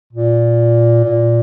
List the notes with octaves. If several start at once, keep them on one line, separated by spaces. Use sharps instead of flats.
A#2
A#2